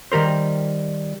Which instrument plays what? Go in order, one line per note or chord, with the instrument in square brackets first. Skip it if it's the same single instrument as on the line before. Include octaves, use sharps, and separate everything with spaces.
[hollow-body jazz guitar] D#3 G3 A#4 C5